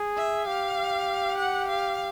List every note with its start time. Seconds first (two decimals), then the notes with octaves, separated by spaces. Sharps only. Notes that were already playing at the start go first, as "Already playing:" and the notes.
Already playing: G#4
0.17 E5
0.47 G4 F5
1.38 F#5
1.68 F5